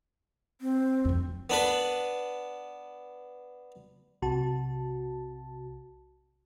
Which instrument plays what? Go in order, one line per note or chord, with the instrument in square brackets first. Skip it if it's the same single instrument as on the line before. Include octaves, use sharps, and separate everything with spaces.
[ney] C4
[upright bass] F2 F#3
[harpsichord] B3 D4 B4
[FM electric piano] B1 C3 F#4 A5